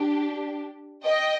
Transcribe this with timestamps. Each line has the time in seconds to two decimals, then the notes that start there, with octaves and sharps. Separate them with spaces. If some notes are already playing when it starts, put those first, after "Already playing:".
Already playing: D4 G4
1.05 D#5 G5